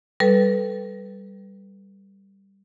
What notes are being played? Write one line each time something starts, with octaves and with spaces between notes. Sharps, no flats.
G3 A4 B4